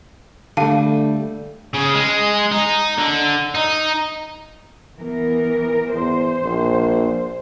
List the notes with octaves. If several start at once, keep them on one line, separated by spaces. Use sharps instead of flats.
D3 G3 A3 F5 A5 D#7
C#3
G#3
D#4
D3
D#4
E3 B3 A#4
E2 C5
A#1